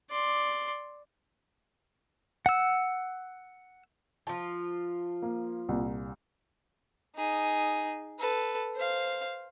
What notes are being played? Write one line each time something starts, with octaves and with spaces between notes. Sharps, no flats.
D5 C6
F#5 E6
F3 F4 A5
A#3
C2 A#2
D#4 G#4
A4 B4
C5 F5